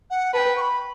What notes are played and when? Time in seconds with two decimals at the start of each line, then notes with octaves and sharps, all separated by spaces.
0.10 F#5
0.34 B4 A5
0.38 G5
0.57 C#6
0.61 B5